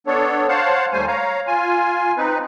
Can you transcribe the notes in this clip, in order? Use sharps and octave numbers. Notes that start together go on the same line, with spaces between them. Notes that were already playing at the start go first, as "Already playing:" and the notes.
B3 D4 A4 C#5
C5 C#5 F5 F#5 A5
D#2 G3 A3 C5 G#5
C#5 F5 A#5
F4 G#5
C4 D#4 B4